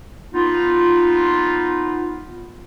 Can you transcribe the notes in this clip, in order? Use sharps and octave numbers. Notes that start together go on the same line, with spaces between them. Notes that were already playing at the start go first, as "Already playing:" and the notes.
B3 D#4 F4